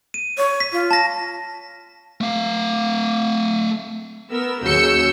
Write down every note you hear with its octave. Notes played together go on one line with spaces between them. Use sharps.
D#7
C#5
B6
F4
A5 A#6
A3 F5
B3 A#4 E6
D#2 C#3 F#3 E6 G6 C#7